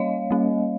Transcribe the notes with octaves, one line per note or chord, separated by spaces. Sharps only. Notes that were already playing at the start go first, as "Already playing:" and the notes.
Already playing: G3 A#3 C#4 C#5 D#5 F5
G3 A#3 C#4